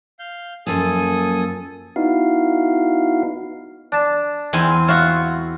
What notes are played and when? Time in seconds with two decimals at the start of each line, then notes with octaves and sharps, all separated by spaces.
0.19 F5 G6
0.67 F#2 F3 A#3 A4 G#5 D#6
1.96 B3 D#4 E4 F#4 F5
3.92 D4 A5
4.53 E2 C4 G#5
4.88 F4 F#4 C#5 E5 C6